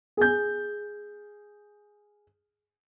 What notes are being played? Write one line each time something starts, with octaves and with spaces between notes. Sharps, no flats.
G#4 G6